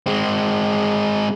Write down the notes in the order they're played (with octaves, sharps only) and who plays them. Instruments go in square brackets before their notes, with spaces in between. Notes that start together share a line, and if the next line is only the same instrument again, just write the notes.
[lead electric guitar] G#3 C4